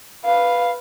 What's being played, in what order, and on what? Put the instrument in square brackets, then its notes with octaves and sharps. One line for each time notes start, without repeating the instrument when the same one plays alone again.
[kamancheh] B4 F5